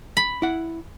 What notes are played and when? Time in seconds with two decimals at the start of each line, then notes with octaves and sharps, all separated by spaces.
0.17 B5
0.42 E4 F#5